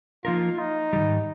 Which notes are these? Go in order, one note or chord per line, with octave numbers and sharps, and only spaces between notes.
F3 A#3 D#4 F4 A#4
D#4
G#2 D#3 G3